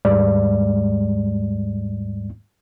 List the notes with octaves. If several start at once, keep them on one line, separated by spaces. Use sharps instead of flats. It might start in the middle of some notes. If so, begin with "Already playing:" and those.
D#2 G#2 G3 G#3 D5